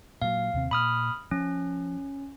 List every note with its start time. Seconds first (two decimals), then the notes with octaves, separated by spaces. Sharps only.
0.22 A#2 F#3 F5
0.53 D#2 C3 C4
0.71 A#2 B5 D#6 F6
1.31 F3 C#4